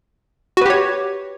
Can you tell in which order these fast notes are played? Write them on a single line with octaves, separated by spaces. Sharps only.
F#4 B4 G4 C#5